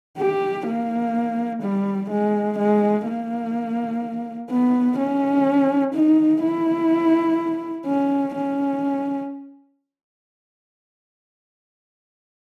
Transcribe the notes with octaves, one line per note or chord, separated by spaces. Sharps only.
G4
A#3
G3
G#3
G#3
A#3
B3
C#4
D#4
E4
C#4
C#4